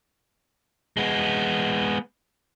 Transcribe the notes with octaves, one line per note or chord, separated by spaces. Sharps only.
G#3 B3